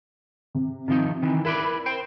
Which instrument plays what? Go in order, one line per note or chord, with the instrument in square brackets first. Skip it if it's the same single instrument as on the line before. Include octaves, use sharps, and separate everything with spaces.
[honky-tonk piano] C3
[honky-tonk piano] C3 [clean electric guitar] D#3 F3 D#4
[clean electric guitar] D#3 E3
[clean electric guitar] E4 B4 D5 [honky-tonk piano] A#4 B5
[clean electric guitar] C5 G5